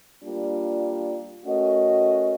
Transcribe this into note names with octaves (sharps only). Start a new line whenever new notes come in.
G3 A#3 D4 F4
A3 C#4 F#4 A#4 D#5